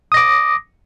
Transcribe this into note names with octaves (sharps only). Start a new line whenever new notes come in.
D6 D#6 A#6